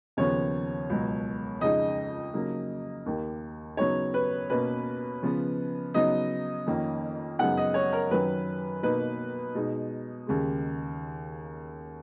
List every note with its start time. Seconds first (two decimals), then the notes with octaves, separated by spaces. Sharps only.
0.17 D#2 C#3 F3 B3 C#5
0.90 C#2 B2 F#3
1.61 F2 C#3 G#3 D#4 D#5
2.33 C#3 F#3 A#3 D#4
3.06 D#2 D#3 A#3
3.77 C#3 F#3 B3 D#4 C#5
4.14 B4
4.50 B2 A#3 C#4 B4
5.23 C#3 F3 B3
5.94 C#3 F#3 B3 D#4 D#5
6.66 F2 D#3 A#3 C#4
7.39 F#2 C#3 G#3 B3 D#4 F#5
7.57 D#5
7.74 C#5
7.93 A#4
8.11 F#2 D#3 F#3 C#4 B4
8.83 B2 A#3 D#4 B4
9.55 B2 G#3 D#4
10.27 D#2 C#3 G#3